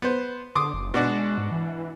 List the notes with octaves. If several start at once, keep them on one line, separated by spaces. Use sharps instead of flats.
B3 C5
D3 C6 D6 D#6
F#1
B2 G#3 D4 F#4
G#2
E3